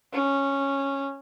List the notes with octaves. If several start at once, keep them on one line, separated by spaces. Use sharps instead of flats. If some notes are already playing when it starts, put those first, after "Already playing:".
C#4